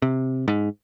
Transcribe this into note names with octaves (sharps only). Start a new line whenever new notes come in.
C3
G#2